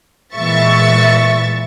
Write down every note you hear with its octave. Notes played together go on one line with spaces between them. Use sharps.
A#2 E3 G#3 E5 C#6 A6